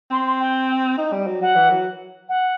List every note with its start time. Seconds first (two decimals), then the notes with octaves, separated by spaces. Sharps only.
0.11 C4 C6
0.26 C6
0.39 G5
0.98 D#4
1.12 G3
1.27 F#3
1.41 F#3 F#5
1.55 E3
1.70 F#3
2.28 F#5